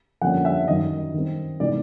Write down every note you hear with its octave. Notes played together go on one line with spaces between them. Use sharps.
F2 D3 G3 A#3 C#4 F#5
E5
F#2 D#3 G3 D#5
D#3 G3 C4
C3 E3 G#3 B3 D#4 D5